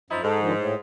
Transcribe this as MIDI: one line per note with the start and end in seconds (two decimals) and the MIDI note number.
0.10 0.19 42
0.10 0.21 53
0.10 0.21 63
0.10 0.21 64
0.23 0.79 44
0.23 0.38 69
0.40 0.53 50
0.40 0.53 51
0.40 0.53 53
0.55 0.75 45